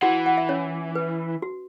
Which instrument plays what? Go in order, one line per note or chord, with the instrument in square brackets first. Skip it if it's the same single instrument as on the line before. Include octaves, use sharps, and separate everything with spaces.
[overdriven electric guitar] E3 [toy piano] F#4 F#5
[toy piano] F#5
E5
C#4 C#5
B4
F#4